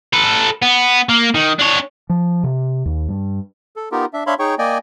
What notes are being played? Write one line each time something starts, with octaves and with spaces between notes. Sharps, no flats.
A4 B4
B3
A#3
D#3
D4 C#5
F3
C3
D#2
G2
A4
B3 D#4 F4 G4 A#4
D4 E5
D4 C#5 E5 F5 B5 C6
D#4 G#4 C#5 G5 C#6
A#3 D5 D#5 G5 G#5